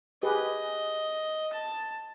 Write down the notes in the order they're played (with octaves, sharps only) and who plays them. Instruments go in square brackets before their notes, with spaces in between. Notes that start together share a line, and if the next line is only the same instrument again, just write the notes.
[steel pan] G4 G#4 B4 [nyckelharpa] D#5
[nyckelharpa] A5